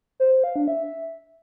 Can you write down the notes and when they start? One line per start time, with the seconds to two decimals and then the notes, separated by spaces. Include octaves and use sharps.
0.20 C5
0.32 C5
0.44 F5
0.56 D4
0.68 E5